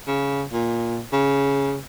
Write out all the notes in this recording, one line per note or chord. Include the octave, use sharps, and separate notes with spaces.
C#3
A#2
C#3